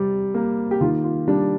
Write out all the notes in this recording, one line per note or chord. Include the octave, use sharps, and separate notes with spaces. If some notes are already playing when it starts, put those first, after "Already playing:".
Already playing: C3 G3
A#3
G4
D#3 F4
F4
G3 D4